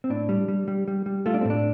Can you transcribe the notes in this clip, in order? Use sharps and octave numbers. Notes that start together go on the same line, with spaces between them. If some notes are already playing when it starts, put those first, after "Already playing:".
C4
A2 D4
G3
G3
G3
G3
G3
A3 F4
D4
C4
A2
D4